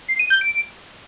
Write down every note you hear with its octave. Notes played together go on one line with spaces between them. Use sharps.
C7
D#7
G6
D7